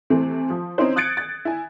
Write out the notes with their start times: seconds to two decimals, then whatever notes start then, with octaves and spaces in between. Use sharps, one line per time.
0.10 C3 E3 A3 C4
0.50 F3
0.78 C4 C#4 D#4 E4 C5
0.96 D#6 F#6 G#6 A6 C#7 D7
1.17 A6
1.45 E4 G#5